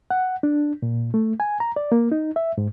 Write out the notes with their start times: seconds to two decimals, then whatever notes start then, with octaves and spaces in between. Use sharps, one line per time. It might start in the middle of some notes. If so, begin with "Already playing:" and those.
0.10 F#5
0.43 D4
0.82 A#2
1.14 A3
1.40 G#5
1.60 A#5
1.76 D5
1.92 A#3
2.12 D#4
2.36 E5
2.58 G#2